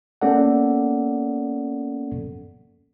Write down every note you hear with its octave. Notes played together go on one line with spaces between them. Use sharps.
A#3 B3 C#4 A4 D5 F#5